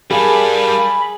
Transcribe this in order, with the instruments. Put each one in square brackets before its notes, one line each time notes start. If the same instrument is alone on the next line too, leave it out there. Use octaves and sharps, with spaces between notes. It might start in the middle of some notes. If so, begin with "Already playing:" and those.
[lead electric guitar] G3 D4 [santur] G#4 [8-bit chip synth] A#4 F5 A5 [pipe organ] B5